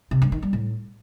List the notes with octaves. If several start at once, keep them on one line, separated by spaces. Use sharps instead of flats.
C3
G2
D#3
G3
A2